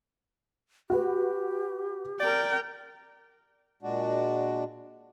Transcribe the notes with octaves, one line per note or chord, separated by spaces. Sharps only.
F#4 G4 B4
A#4 D5 G5
A#2 G#3 D4 F#4